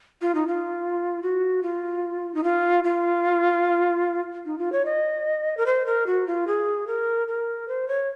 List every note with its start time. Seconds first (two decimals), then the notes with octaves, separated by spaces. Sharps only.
0.21 F4
0.35 D#4
0.47 F4
1.23 F#4
1.63 F4
2.35 D#4
2.44 F4
2.84 F4
4.45 D#4
4.58 F4
4.72 C#5
4.85 D#5
5.57 A#4
5.66 C5
5.86 A#4
6.06 F#4
6.27 F4
6.47 G#4
6.87 A#4
7.28 A#4
7.68 C5
7.88 C#5